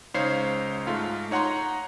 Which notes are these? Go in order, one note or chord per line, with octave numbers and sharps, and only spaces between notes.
C#2 D#4 C5 C#5 F5 C7
G#2 A3 F4 F5
D#4 C#5 F#5 A#5 C6